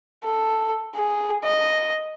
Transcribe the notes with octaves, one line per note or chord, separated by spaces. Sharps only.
A4
G#4
D#5